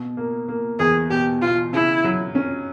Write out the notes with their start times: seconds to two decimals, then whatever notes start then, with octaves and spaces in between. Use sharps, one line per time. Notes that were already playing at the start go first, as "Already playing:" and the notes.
Already playing: B2
0.17 A#3
0.48 A#3
0.79 E2 G#4
1.10 B2 G4
1.42 B2 F4
1.73 C#3 E4
2.04 F#3
2.35 C#4